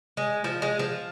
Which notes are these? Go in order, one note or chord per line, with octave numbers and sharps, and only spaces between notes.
G#3
F3
G#3
F3